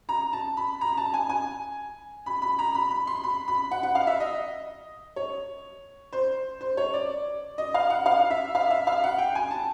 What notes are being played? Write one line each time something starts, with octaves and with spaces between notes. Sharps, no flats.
A#5
A5
B5
A#5
A5
G#5
G#5
B5
B5
A#5
B5
B5
C6
B5
B5
F#5
F#5
F5
E5
D#5
C#5
C5
C5
C#5
D5
D#5
F5
F#5
F5
E5
F5
E5
F5
F#5
G5
G#5
A5